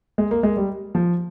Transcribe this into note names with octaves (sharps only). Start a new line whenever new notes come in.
G#3
A#3
G#3
G3
F3